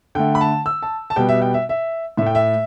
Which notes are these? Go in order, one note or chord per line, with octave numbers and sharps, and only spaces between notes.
D3 A3 G5
B5
A5
E6
A5
A5
B2 G3 B3 G5
E5
G5
E5
E5
A2 A3 E5 G5
E5